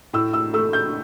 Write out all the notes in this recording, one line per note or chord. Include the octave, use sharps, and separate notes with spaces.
A2 E6
E6
A3 E6
G6